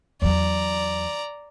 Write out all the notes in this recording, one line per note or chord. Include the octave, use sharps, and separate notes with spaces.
E2 F#3 D5 A#5